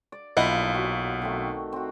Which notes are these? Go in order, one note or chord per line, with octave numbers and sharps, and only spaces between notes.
D5
B1 A#2 F3 E4 D#5 F#5
F#3 F#4 G4
D#3 A3 C4
C4 F#4